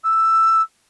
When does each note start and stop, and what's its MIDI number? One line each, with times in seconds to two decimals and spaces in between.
0.03 0.61 88